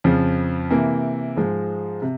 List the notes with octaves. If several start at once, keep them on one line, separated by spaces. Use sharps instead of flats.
F2 C#3 F3
C3 E3 A#3
G#2 F3 G#3
C3